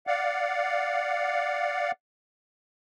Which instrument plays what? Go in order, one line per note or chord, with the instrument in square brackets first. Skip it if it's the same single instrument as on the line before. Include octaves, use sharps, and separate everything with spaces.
[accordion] D5 F5 F#5